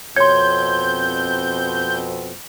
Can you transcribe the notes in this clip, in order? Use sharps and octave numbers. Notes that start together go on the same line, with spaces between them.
F2 B2 C4 C#5 C6 G6 G#6